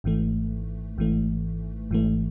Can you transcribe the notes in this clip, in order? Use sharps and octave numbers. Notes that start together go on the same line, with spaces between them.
G#1 G#2 E3 A3
G#1 G#2 E3 A3
G#1 G#2 E3 A3